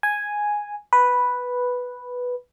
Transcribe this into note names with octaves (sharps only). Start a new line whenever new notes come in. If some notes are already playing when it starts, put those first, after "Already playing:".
G#5
B4